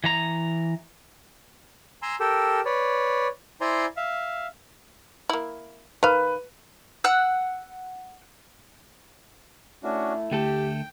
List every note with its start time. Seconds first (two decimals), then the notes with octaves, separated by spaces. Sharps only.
0.04 E3 A#5
2.02 G#5 A#5 C6 E6
2.20 G4 A4 A#4 G5 E6
2.65 B4 C#5 D5
3.61 E4 C5 D5 G#5 A#5 C6
3.97 E5 F5
5.30 A#3 E4
6.03 D#3 B4 F5
7.04 F#5 E6 F#6
9.83 A3 C#4 D4 E4 F#4
10.31 D2 A3 G4 A4 G5